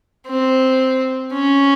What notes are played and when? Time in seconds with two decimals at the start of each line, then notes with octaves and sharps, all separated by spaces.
0.27 C4
1.33 C#4